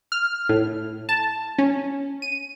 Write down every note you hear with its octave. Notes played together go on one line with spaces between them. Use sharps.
F6
A2
A5
C#4
D#7